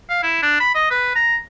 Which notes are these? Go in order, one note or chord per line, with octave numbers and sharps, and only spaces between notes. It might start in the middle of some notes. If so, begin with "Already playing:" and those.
F5
E4
D4
B5
D#5
B4
A#5